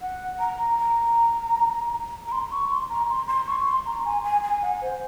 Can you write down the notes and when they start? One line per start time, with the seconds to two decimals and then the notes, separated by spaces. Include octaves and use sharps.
0.01 F#5
0.40 A#5
0.79 A#5
2.27 A#5
2.32 C6
2.51 C#6
2.71 C6
2.89 A#5
3.09 C6
3.28 C6
3.47 C#6
3.66 C6
3.86 A#5
4.05 G#5
4.24 G#5
4.43 G#5
4.62 F#5
4.82 C5